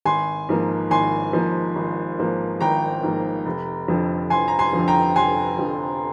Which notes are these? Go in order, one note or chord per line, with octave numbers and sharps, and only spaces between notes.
G#1 G#5 C6
G#2 F3 A#3
G#1 G#5 C6
G#2 F3 A#3
G#1
G#2 F3 A#3
G#1 G5 A#5
G#2 F3 A#3
F1
F2 D3 F3
F1 G#5 C6
A#5
G#5 C6
F2 D3 F3
G5 A#5
F1 G#5 C6
F2 D3 F3